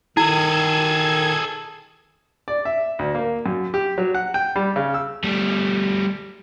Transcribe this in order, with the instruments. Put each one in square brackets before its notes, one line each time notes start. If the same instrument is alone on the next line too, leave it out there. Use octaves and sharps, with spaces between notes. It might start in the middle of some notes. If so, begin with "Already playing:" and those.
[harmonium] D#3 [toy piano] E4 [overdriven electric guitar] G#4 A4 [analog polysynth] G#6
[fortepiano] D5
E5
D2
A#3
F#2
G4
F#3
F#5
G5
G3
C#3
E6
[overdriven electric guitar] G3 A3